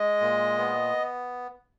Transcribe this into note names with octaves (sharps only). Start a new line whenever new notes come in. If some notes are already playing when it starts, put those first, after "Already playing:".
Already playing: G#3 D#5
A#2
B3